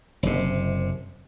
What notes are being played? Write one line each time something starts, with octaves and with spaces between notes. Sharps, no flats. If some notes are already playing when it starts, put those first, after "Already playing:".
F#1 C3